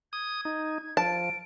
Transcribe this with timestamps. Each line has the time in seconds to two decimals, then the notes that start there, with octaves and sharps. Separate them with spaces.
0.13 D#6 G#6
0.45 D#4
0.97 F3 A5 D7